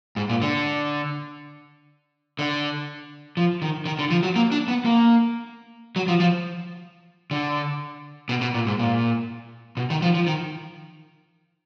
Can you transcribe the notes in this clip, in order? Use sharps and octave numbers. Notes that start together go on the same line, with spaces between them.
G#2
A#2
D3
D3
F3
D#3
D#3
D3
F3
F#3
A#3
D4
B3
A#3
F#3
F3
F3
D3
B2
B2
A#2
G#2
A#2
B2
D#3
F3
F3
D#3